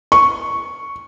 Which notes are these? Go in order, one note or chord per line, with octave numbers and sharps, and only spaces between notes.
C#6